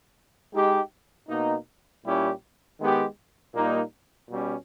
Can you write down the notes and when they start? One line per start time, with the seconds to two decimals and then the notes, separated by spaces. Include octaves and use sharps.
0.53 G#3 D#4 G4
1.28 B2 A#3 D#4
2.04 A#2 G3 C#4 E4 G4
2.80 D#3 G#3 B3 G4
3.54 A#2 G3 A#3 D#4
4.30 B2 G3 C#4